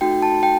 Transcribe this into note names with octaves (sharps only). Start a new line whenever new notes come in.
A3 D#4 F#4 A4 G5
A5
G5